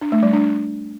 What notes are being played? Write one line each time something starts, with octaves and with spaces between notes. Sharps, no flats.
D4
A3
G3
D4